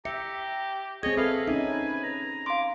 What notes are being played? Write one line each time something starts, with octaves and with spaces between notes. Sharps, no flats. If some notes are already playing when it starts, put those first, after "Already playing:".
G4 E5 A#5 C#7
C4 G#4 C#5 D#5 G#6
A4 B4 E5 F5
C#4 D#4 E5 G#5
A#5
F5 C6 D6